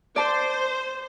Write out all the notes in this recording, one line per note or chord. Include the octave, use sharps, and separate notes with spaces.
C5 D5 A5